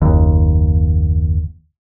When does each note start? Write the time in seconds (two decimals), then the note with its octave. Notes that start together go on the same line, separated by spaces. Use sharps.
0.02 F#1 D#2